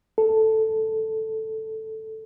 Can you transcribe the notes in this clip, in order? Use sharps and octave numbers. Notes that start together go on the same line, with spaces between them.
A4